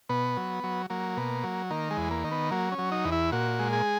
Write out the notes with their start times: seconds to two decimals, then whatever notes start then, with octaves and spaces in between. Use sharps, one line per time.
0.09 B2 B3
0.37 F#3
0.64 F#3
0.90 F#3 A#3
1.17 B2
1.44 F#3
1.71 D#3 A#3
1.91 G#3
1.97 E2
2.11 A#3
2.24 D#3
2.31 B3
2.51 F#3 A#3
2.72 C#4
2.78 F#3
2.92 D#4
3.05 E2
3.12 E4
3.32 A#2 F#4
3.59 G#3
3.73 G#4